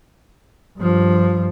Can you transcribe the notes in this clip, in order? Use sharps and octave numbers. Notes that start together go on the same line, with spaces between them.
G2 F3